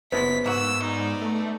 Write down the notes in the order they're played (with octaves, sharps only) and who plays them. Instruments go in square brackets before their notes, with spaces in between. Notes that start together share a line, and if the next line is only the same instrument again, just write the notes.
[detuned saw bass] F#1 [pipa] C3 F3 F#3 [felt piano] B3 B4 [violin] B6
[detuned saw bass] G#2 [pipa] A#3 F#4 [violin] E6
[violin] D#4 D5
[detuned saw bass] A3